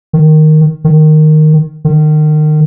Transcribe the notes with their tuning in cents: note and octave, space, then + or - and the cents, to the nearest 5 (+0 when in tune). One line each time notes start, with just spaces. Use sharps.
D#3 -5
D#3 -10
D#3 -30